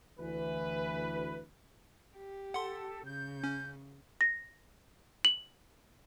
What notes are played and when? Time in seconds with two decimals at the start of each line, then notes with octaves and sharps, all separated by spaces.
0.19 D2 E3 B4
2.16 G4
2.54 A4 F#5 C6
3.05 C#3 G6
3.43 C#4
4.21 A#6
5.25 F#7